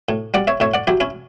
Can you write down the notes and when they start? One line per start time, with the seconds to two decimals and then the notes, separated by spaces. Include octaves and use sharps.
0.09 A2
0.34 G3 D5 F#5
0.47 C#5 E5
0.60 A2 C#5 E5
0.74 D5 F#5
0.87 F#3 E4 G4
1.00 C#4 E4